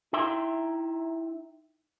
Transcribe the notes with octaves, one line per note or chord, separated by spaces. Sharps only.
D#4 E4 E5 G5 C6